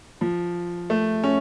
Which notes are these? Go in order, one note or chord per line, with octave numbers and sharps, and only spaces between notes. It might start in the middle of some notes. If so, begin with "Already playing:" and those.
F3
A3
C#4